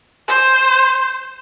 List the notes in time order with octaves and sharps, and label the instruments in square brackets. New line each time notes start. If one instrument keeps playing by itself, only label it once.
[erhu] C5